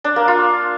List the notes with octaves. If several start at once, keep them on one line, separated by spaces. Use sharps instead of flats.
D4
A#3
F4